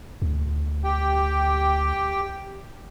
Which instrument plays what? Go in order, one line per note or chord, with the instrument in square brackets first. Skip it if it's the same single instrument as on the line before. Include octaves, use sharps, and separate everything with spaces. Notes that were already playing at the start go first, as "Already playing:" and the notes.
[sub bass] D2
[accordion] G4 G5